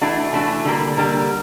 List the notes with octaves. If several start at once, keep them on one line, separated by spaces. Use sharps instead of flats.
E3 A3 D4 F#4
E3 A3 D4 F#4
D3 G3 A#3
D3 G3 A#3